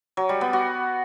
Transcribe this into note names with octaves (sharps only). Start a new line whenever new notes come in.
F#3
G3
B3
F#4